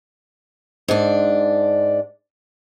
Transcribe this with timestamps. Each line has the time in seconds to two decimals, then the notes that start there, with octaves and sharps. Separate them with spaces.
0.88 G#2 D4